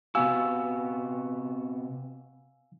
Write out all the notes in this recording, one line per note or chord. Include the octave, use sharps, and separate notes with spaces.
C3 B3 F#4 F5 G#5 E6